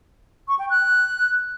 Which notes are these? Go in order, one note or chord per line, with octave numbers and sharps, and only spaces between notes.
C#6
G5
F#6